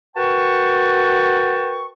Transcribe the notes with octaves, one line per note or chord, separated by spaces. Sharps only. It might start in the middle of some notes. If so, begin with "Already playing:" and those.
F#4 A#4 B4 G5 A5 C#6